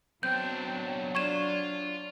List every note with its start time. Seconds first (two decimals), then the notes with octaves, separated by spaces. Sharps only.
0.23 B1 F#3 C4 D4 G6
1.15 D4 F4 C#6 G#6 E7